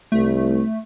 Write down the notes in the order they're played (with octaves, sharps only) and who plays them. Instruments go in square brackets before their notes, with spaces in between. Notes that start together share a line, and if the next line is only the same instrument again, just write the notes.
[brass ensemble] C2 [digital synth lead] A3